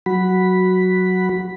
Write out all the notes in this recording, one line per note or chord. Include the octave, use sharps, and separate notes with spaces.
F#3 F#4 B5